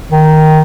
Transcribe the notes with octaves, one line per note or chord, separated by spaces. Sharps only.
D#3